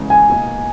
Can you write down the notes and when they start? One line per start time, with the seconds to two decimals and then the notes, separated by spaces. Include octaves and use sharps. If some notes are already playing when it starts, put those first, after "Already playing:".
Already playing: E2 C#3 E3 G#3 C#4
0.10 G#5
0.28 B2 A#3 D#4